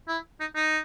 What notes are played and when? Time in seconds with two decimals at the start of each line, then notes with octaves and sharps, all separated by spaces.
0.08 E4
0.41 D#4
0.56 D#4